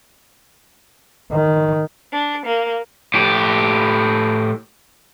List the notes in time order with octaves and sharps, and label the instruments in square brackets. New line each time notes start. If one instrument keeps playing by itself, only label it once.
[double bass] D#3
[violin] D4
A#3
[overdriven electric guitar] A2 G4